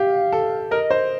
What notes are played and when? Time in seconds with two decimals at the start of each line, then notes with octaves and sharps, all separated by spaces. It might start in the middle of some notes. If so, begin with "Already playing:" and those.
Already playing: G4 F5
0.32 A4
0.71 A#4 D#5
0.91 C5